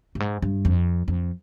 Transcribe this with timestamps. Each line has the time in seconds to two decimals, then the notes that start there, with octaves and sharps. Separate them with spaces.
0.15 G2
0.20 G#2
0.42 G2
0.65 F2
1.08 F2